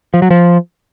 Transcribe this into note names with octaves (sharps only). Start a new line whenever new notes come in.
F3
F#3
F3